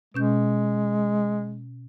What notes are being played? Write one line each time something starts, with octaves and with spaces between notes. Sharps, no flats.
B2 G#3 C#4 G6